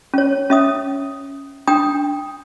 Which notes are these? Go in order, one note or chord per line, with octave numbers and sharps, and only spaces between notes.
C#4 C#5
C#4 E5 D#6
D4 G5 D#6